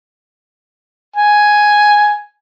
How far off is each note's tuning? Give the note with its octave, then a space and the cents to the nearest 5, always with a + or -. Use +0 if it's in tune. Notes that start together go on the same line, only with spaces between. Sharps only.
G#5 +5